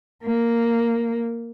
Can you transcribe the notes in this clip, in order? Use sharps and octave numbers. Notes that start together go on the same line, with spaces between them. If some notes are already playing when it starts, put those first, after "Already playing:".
A#3